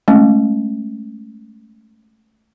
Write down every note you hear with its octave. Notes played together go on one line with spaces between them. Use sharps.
G#3 A3 C#4